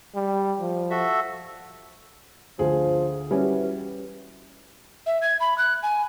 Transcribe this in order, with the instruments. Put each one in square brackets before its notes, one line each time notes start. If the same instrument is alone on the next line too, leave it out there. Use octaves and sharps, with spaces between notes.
[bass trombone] G3
F3
[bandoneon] F#4 A4 E5
[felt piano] D2 G#4 [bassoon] F3
[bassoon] E3 [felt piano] G3 C#4 F#4
[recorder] E5
G#6
B5
F#6
G#5